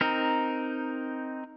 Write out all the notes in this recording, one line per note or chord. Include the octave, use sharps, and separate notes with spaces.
C4 D#4 A#4